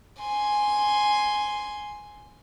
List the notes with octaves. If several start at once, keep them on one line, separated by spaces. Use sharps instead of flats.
G#5 C6